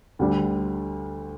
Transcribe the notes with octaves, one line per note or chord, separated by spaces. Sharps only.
D2 D3 G3